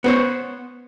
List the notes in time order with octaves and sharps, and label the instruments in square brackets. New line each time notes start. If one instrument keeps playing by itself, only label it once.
[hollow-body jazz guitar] B3 C5 C#5